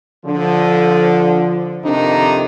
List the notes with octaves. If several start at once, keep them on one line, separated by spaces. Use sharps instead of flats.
D3 F3
F2 C3 D#3 D4 D#4